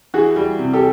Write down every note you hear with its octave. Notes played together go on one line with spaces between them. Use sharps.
E3 F#4 G#4
G3
C3
G4 A4